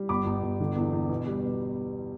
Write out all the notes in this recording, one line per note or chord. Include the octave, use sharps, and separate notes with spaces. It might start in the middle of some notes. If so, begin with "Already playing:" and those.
Already playing: G3
G1 B5 D6
G1
G1
D3
E2
E2
B2
G3
B2